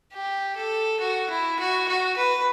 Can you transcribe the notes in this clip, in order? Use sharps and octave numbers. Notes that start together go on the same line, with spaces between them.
G4
A4
F#4
E4
F#4
F#4
B4